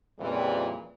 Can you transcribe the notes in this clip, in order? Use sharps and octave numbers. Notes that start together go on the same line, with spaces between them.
F2 A#2 C#3 E3 G3